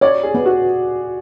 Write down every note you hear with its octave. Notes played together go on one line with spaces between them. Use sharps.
C#5 D5
G#4
B3
F#4